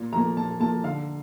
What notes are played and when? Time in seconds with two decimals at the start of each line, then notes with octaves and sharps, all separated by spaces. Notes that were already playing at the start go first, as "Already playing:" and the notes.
Already playing: A#2
0.13 F3 A#3 A#5
0.36 A#2 A5
0.60 F3 A#3 A5
0.84 D3 F5